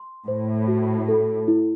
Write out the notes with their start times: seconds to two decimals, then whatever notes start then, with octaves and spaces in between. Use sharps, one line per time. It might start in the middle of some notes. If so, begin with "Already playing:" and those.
Already playing: C6
0.28 A2 C5
0.68 F#4
1.08 A4
1.48 E4